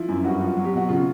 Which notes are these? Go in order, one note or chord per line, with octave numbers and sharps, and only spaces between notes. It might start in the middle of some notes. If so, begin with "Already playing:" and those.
Already playing: F3 E4
F#2
G2 F#4
F3
F#3
G4
B2 F#4
C#3 F4